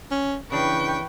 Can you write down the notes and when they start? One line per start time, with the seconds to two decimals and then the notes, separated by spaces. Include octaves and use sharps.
0.11 C#4
0.52 C#3 E3 D4 B4 G5 C#6